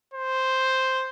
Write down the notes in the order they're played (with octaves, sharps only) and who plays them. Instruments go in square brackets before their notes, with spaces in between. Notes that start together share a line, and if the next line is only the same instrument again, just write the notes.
[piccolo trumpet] C5